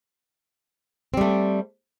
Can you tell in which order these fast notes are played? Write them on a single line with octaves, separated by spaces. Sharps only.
C4 G3 A3